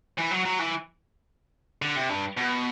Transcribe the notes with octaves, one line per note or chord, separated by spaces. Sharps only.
E3
F#3
F#3
E3
D3
C3
G2
B2